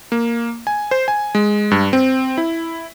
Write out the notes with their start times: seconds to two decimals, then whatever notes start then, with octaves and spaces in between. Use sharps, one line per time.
0.12 A#3
0.67 G#5
0.91 C5
1.08 G#5
1.35 G#3
1.71 G2
1.93 C4
2.38 E4